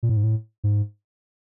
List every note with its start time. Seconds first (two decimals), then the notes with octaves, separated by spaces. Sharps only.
0.03 A#2
0.09 A2
0.17 G#2
0.23 A2
0.64 G#2